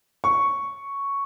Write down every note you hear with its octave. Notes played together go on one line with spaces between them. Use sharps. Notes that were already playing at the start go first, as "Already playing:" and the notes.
C#6